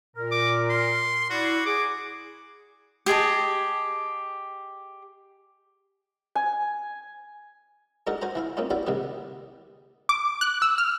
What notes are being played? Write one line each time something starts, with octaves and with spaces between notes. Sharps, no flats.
A#2 A#4
D6
C6
E4 F#4 D5
G#4 D6
G4 G#4 D#5 A5
G#5
G#3 D4 D#4 F#4 A4 A#4
F#4 C5 G#5 A#5
E3 E4 F5
A#3 C4 C#4 D#4 F4
E4 F#4 G4 B4 D5 F5
D#2 G#2 C3 D#3 G3 G4
D6
F#6
E6
F6